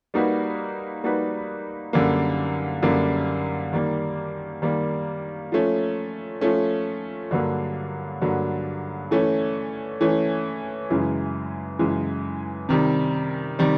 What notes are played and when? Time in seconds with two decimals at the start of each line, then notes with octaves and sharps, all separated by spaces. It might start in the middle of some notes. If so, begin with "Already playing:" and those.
0.14 G3 A#3 D#4 F#4 B4
1.04 G3 A#3 D#4 F#4 B4
1.93 F#2 D3 G3 A#3
2.82 F#2 D3 G3 A#3
3.73 D#3 G3 A#3
4.62 D#3 G3 A#3
5.52 F3 A3 C#4
6.41 F3 A3 C#4
7.31 G2 D3 F#3 A#3
8.22 G2 D3 F#3 A#3
9.11 E3 A3 C#4
10.01 E3 A3 C#4
10.90 F#2 C#3 E3 G#3
11.79 F#2 C#3 E3 G#3
12.69 C3 D#3 G3
13.59 C3 D#3 G3